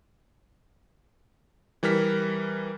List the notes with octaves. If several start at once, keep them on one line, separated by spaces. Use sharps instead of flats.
E3 G3 A#4 F6 B6